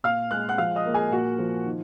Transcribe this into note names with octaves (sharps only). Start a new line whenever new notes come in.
A#2 F5 F6
G#3 F#6
F#5 F#6
F3 F5 F6
D#5 D#6
A#3
G#4 G#5
A#2 F#4 F#5
F3
D#3